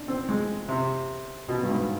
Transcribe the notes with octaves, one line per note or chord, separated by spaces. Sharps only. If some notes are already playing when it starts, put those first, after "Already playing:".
Already playing: D4
C4
G#3
C3
B2
G2
G#2